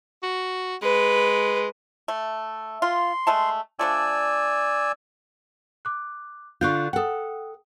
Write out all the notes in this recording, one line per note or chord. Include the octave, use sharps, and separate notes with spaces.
F#4
G#3 B4
A3
F4 C6
G#3 A3 A5
F3 A3 D4 D5 G#5 E6
D6 F#6
D3 D4 F4 C#6 F#6 G6
A4 F#5 G5 D#6